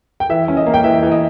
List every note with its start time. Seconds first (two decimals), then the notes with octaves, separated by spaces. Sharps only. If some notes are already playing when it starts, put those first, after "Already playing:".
0.20 G5
0.29 E3 E5
0.48 C#4
0.57 D#5
0.66 A#3
0.74 G5
0.84 E3 E5
1.03 E3
1.11 D#5